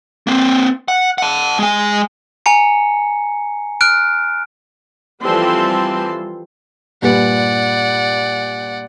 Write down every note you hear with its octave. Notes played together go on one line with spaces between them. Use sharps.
A#3 C4
F#5
F#5 A5
G#3 G#5
G#5 A#5 C#7
F6 F#6 D7
E3 F3 G3 C4 A4 C6
G2 A#2 B4 D5 F#5